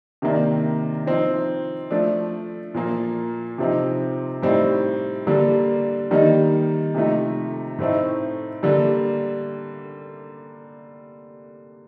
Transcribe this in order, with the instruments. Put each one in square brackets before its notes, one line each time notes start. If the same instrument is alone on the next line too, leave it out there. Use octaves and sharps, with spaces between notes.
[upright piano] C3 D#3 A#3 D4
F3 C4 D#4
F3 A3 D4
A#2 F3 A#3
C3 F3 C4 D#4
A2 G3 C4 D#4
D3 G3 A#3 D4
D#3 G3 A#3 D#4
C3 F3 A3 D#4
A2 A3 C4 D#4
D3 G3 A#3